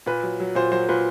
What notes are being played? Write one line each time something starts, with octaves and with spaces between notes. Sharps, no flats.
A#2 B4
F#3
F#3
A#2 C5
F#3 C5
A#2 B4